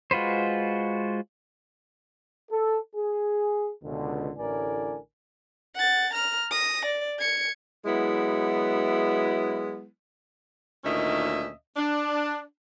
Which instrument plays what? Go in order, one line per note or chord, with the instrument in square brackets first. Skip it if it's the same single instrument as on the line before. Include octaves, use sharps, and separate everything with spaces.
[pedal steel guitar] G#3 F4 F#4 B4 C5
[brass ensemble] A4
G#4
C#2 B2 D3
A1 A2 D3 A#4 D5 G#5
[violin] F#5 A6
A#5 F6
D#6 A#6
D5
G#6 C#7
[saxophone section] F#3 G#3 B3 E4
D2 A#2 D#3 C#4 D#5 E5
D4